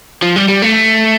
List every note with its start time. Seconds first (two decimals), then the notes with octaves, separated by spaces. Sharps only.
0.22 F3
0.36 G3
0.48 G3
0.62 A3